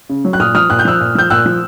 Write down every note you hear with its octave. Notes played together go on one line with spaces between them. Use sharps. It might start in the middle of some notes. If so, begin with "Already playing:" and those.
C#3
F#3
F#6
A#2 D#6 F6
F3 D#6 F6
A#2 F#6
G6
F3 E6 F#6
A#2
F3 G6
A#2 E6 F#6
F3